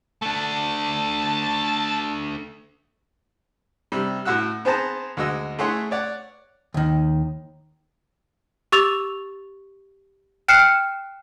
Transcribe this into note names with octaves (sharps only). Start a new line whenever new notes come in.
A3 D4 A5
C3 G3
A2 F#4 F#5 E6 F#6
B3 C4 G#4 C5 A5 A#5
D2 G#3 F#4 D#5 E6
A3 E4 G#4 C#5 F#5 C6
C#5 D5 F#5
D#2 D#3
G4 C#6 E6 A6 F7
G5 F6 F#6 C7 C#7 E7